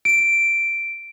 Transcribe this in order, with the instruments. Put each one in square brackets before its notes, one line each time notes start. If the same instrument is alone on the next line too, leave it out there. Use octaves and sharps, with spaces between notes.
[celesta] D7